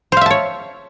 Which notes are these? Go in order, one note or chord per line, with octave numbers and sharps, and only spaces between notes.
C5 C#5 E5 F5 A5